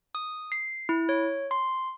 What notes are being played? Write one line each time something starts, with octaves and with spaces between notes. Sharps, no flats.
D#6
C7
E4
C#5
C6